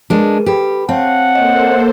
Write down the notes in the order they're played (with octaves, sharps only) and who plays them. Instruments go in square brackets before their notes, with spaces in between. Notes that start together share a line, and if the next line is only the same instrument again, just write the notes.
[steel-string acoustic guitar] G#3 D4 [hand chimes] G#4 A#4 B4
[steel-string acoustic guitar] G4 [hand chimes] A4 B4 B5
[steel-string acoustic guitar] C4 [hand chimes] C#5 F5 A5 [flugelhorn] F#5
[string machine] A#3 A4 C5 [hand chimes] C#5 D#5